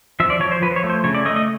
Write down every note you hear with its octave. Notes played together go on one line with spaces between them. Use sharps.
F3 E5
D5
F3 C#5
C5
F3 B4
C#5
A3
C5
C#3 C#5
D5
A3 D#5
D#5